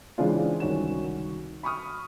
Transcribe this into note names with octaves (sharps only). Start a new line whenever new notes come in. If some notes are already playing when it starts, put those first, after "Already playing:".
C#3 E3 G#3 C4 D4 F4
C2 D#3 C#4 F#4 E7
B5 C#6 D#6 F6